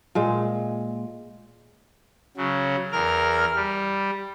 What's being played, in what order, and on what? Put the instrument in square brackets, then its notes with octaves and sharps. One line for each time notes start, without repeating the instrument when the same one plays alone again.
[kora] A#2 G#3
[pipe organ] C#3 F#3
E2 A#4 F6
G3